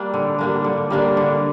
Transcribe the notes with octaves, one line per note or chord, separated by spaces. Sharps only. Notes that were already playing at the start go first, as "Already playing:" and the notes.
Already playing: G3 A#3 D4
D3
G3 A#3 D4
D3
G3 A#3 D4
D3